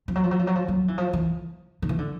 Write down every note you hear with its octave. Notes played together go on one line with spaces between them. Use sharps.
F3
F#3
F3
F#3
F3
F#3
F3
F#3
E3
F3
E3
D#3
E3
D3